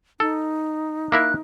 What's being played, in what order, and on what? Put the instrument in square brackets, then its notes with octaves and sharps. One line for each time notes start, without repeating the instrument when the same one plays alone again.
[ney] D#4 [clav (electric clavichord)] A4
[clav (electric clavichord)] A#3 E4 A#4 [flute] F#6